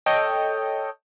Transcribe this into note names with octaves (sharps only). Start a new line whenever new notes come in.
A4 C#5 D#5 G5